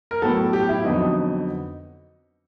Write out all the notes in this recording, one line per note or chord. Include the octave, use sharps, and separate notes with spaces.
A#4
A2 F#3 B3 A4
G4
E4
F2 D3 F#3 B3 D#4